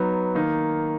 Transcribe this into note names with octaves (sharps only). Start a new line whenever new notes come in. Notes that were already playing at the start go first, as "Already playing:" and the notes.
Already playing: F#3 B3 D#4
D#3 A#3 D#4